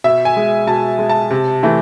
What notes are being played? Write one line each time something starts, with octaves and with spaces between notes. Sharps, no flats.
B2 E5
G#5
G#3
B2 A5
G#3
A5
C3
E3 A3